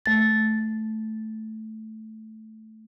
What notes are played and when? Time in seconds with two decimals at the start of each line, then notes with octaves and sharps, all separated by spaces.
0.06 A3 A6